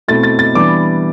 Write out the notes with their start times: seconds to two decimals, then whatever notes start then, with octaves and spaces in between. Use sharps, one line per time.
0.08 B2 A3 C4 E4 A6
0.23 A6
0.39 A6
0.55 E3 G3 B3 D4 D6